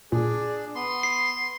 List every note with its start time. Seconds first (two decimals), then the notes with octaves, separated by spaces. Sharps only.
0.12 A#2 D4 G#4
0.75 B3 C6
1.03 C7